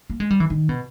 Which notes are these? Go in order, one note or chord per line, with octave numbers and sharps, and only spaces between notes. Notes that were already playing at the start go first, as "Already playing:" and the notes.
A#3
G#3
G3
E3
D#3
B2